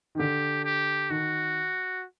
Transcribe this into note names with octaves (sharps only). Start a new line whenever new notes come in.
D#3
D3 G4
G4
D#3 F#4